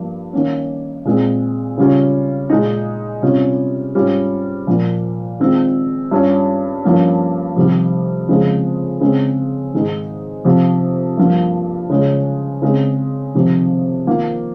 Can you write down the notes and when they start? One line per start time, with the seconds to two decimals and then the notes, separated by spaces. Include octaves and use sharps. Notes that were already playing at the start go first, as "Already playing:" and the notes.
Already playing: G2 F3 A#3
0.33 D#3 A#3 C#4
1.05 A#2 G#3 C4
1.78 C#3 G3 C#4 F4
2.50 A#2 G#3 D#4
3.22 C3 G3 C#4 F4
3.95 G#2 G3 C#4 F4
4.67 A#2 F3 A#3
5.40 D#3 G#3 C4 F4
6.11 G2 G3 C#4 F4
6.84 G2 F3 A#3 C#4
7.56 F2 C3 D#3 G3
8.28 F2 C#3 F3 G#3
9.00 C#3 G#3 C4
9.74 G#2 D#3 G#3 D#4
10.45 F2 C3 F3 C4
11.17 G2 F3 A#3 F4
11.90 C#3 G#3 C#4 F4
12.62 C#3 G#3 C4
13.34 F2 C3 D#3
14.07 D#3 A#3 F4